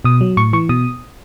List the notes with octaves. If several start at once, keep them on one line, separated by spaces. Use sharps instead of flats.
B2 D#6
F#3
A2 C#6
E3 C#6
B2 D#6